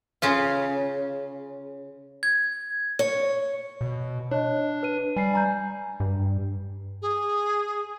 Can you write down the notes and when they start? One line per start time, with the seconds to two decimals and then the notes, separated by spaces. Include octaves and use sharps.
0.22 C#3 C#4 F4
2.23 G#6
2.99 C#5
3.81 B2
4.31 D4 C#5 D#5
4.83 B4 D#7
5.16 G3 G#5 C7
5.33 G#5 A#5 G6
6.00 G2
7.02 G#4